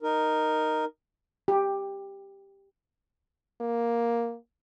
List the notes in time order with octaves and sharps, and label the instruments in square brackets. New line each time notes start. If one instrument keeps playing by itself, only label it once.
[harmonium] D#4 A#4
[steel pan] G4
[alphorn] A#3